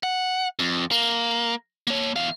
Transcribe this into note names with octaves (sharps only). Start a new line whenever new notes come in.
F#5
F2
A#3
A#3 C#5
E2 F5